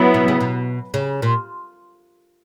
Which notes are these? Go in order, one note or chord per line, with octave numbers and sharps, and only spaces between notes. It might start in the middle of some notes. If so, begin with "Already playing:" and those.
Already playing: F#3 B3 E4
B2
C#3
B2
C#3
A#2